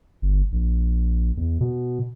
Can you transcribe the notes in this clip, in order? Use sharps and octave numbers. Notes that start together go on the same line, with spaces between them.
G1
A#1
E2
B2